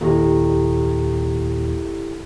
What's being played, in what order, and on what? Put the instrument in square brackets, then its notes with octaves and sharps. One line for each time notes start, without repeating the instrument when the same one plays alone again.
[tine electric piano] D#2 A#2 [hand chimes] E4 G4 A4